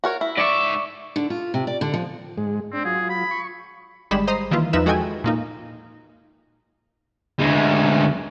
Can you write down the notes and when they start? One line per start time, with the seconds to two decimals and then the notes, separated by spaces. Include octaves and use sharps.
0.04 F#4 A#4 C#5
0.21 E4
0.37 G#2 D5 E5 C#6
1.16 D3
1.30 F4
1.54 C3
1.67 D5
1.81 D3
1.94 F3
2.38 G#2 G#3
2.73 C4 D4
2.85 F#3 F4 G#4
3.10 B5
3.31 C#6
4.11 G#1 G3 G#3 B5 E7
4.27 C5 D#5 A#5 D#6 C7
4.51 D#3 E3 A#3 E4 F4
4.73 E2 F3 D#4 B4 E5 E7
4.86 G#3 F#4 A4 D#5 G5 G#5
5.24 A#2 A#3 D#4
7.40 D2 G#3